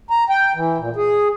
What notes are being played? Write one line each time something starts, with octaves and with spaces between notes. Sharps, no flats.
A#5
G5
E3
A#2
G#4